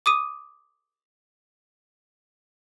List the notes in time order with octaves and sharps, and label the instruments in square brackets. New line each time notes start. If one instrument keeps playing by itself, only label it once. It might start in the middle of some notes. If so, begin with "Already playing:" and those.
[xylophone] D6 D#6 D#7